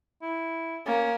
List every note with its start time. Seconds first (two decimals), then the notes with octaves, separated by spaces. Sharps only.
0.22 E4
0.86 A#3 C#4